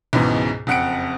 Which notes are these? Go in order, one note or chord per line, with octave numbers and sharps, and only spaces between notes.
C#2 G#2 B2 E3
F#1 F2 F#5 F#6 C#7 D7